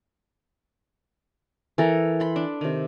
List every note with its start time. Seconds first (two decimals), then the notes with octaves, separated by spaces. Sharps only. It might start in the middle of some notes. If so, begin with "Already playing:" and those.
1.78 E3 A4 A#4
2.20 B5 C6
2.36 D4
2.61 C3 D#3